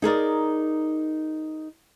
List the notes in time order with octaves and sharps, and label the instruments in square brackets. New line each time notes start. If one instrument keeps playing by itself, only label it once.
[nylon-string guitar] D#4 G#4 A#4 D5